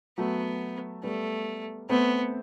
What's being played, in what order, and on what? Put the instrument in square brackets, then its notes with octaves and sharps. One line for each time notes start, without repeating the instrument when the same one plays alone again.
[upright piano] F#3 A3 [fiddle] B3
[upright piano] G3 B3 [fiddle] A3
[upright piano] A3 C4 [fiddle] B3